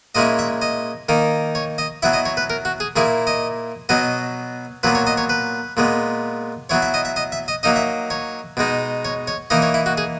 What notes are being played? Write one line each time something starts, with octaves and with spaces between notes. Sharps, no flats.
A#2 G#3 C#4 E4 D#5
E5
D#5
D#3 A#3 D#4
C#5
D#5
F#3 B3 E4 E5
D#5
C#5
B4
A#4
F#4
G#4
A#2 A#3 E4 G#4
D#5
B2 F#3 B3 D#5
A#2 F#3 B3 B4
C#5
D#5
C#5
B4
A#2 G#3 B3
F#3 B3 E4 C#5
E5
D#5
E5
D#5
E5
D#5
F#3 A#3 D#4 D#5
E5
C#5
B2 G#3 D#4
C#5
C#5
E3 A#3 D#4 D#5
C#5
E4
F#4
G#4